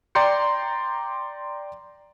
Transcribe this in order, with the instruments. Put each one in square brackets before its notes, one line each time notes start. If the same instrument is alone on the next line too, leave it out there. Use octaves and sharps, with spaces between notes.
[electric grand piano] D5 G5 A#5 C6 G6 C#7